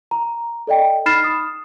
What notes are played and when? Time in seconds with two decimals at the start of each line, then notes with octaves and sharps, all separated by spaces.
0.11 A#5
0.67 A4 D5 D#5 G5
1.06 D#4 B5 F6 A6 C7 E7
1.24 D#6